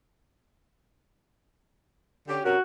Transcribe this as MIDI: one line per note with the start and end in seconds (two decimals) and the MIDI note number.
2.28 2.40 50
2.28 2.40 61
2.28 2.40 67
2.44 2.55 48
2.44 2.55 61
2.44 2.61 66
2.44 2.55 70